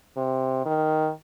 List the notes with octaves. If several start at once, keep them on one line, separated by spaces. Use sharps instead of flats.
C3
D#3